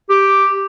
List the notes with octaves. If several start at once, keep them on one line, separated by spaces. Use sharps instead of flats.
G4